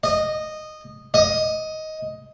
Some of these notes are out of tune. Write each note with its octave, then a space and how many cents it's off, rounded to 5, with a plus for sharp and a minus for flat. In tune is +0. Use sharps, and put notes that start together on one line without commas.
D#5 -10
D#5 +10